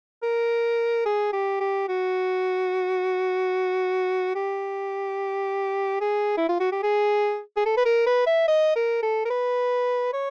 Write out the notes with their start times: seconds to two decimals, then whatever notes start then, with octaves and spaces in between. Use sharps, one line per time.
0.23 A#4
1.06 G#4
1.33 G4
1.60 G4
1.89 F#4
4.35 G4
6.01 G#4
6.38 E4
6.49 F4
6.61 F#4
6.72 G4
6.83 G#4
7.57 G#4
7.66 A4
7.77 B4
7.86 A#4
8.07 B4
8.27 E5
8.48 D#5
8.76 A#4
9.02 A4
9.26 A#4
9.30 B4
10.13 C#5